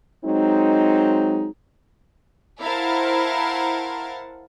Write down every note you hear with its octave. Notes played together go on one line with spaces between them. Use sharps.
F#3 G#3 C4 D#4
E4 A#4 C5 F5 F#5 A5